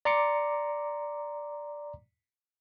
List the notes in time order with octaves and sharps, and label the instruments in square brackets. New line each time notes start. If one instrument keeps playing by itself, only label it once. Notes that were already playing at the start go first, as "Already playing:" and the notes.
[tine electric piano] D5 A#5 C6 D6 C#7